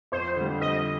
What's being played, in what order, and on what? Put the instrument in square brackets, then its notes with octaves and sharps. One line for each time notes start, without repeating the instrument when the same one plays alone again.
[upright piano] F2 [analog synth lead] C5
[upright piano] D3 G3
[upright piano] F2 [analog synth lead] D#5